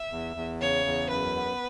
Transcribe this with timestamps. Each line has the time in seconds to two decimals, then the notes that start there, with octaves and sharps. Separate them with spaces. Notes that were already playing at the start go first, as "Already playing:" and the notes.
Already playing: E5
0.11 E2
0.36 E2
0.61 C#3 C#5
0.86 E2
1.10 F#2 B4
1.36 B3